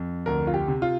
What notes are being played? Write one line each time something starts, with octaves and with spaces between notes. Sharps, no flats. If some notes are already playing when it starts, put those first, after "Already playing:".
Already playing: F2
D2 A#4
F4
G4
C3
F4